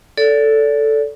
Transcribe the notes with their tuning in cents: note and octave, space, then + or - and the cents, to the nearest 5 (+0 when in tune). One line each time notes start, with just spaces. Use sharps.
A4 +0 D5 -30